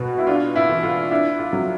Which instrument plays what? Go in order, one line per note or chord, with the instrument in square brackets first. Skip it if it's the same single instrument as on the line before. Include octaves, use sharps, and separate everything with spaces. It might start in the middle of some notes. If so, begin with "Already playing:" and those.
Already playing: [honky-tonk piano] B2 B3 F#4
E4
D4 F4
E4
E3
F4
D4 E4
F4
F#3